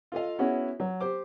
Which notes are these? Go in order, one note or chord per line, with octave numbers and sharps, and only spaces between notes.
F4 A4 D#5 F5
B3 C#4 E4 F#4 G#4 C#5
F#3
G4 C5 D6